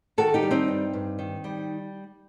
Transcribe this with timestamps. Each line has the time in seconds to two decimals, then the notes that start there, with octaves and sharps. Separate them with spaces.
0.18 D#3 F#4 A4
0.34 D#4 G4
0.43 G3
0.51 C4 D#4
0.68 G2
0.93 G2
1.19 D#3
1.44 G3